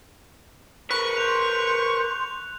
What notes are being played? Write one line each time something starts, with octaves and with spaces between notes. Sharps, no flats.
A#4 B4 C#6 F#6
C6 G6 F7